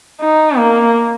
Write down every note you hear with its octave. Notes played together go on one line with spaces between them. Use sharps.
D#4
A#3